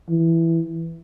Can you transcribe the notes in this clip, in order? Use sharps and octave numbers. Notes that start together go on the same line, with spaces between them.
E3